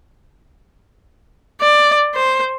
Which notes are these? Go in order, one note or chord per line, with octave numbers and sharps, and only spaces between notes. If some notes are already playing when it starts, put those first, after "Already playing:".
D5
C5